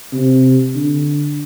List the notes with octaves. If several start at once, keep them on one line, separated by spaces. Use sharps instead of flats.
C3
D3